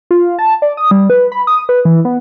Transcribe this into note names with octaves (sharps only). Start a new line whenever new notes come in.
F4
A5
D5
D#6
G3
B4
B5
D#6
B4
E3
B3